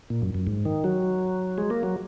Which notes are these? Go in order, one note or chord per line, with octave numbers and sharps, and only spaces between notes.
A#2
F#2
F#2
G#2
D#3
F#3
G#3
A#3
F#3